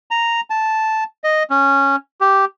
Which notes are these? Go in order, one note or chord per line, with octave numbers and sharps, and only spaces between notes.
A#5
A5
D#5
C#4
G4